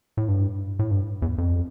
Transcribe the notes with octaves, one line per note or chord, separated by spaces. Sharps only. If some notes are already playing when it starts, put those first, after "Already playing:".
A2
G2
A2
G2
E2
F2